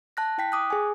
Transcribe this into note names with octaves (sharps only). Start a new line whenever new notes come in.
A5 F#6 A#6
E4 G5 B6
D6 D#6 F#6
G#4 G#5